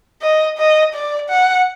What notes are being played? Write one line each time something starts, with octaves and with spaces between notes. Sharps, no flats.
D#5
D#5
D5
F#5